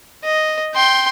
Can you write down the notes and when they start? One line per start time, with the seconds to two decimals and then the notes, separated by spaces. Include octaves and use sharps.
0.24 D#5
0.75 G5 C6